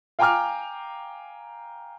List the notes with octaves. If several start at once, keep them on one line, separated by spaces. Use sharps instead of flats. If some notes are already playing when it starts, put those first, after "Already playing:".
F5 G5 G#5 A#5 D6 F6